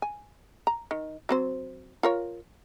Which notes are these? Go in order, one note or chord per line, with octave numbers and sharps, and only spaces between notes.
G#5
A#5
D#3
F#3 C4 C5
F4 A#4 C#5